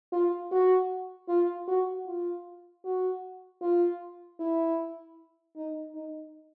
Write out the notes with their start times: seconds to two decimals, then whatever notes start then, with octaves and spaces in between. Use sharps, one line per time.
0.13 F4
0.52 F#4
1.29 F4
1.68 F#4
2.07 F4
2.85 F#4
3.62 F4
4.40 E4
5.56 D#4
5.95 D#4